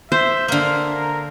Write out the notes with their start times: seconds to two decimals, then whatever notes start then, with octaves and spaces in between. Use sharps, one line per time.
0.12 C5 E5
0.48 D3 A#3 F5
0.92 A#4